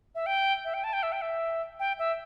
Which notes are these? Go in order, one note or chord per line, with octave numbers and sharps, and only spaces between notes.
E5
G5
E5
G5
A5
G5
E5
G5
E5
G5
E5